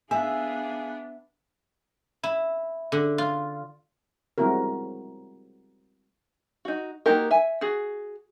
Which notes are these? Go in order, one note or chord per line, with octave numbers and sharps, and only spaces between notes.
B3 D4 G#4 E5 F5 G#5
E4
D3
F4
G3 G#3 C4 E4 F#4 A#4
D#4 F#4
A#3 D#4 F#4 G4 A#4
E5 G#5
F#4 G#4